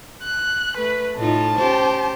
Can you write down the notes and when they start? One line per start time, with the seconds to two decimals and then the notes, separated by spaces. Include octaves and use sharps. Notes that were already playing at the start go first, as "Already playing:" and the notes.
0.23 F#6
0.77 A3 B4
1.18 A2 D#4 F4 A5
1.58 C#4 G4 C5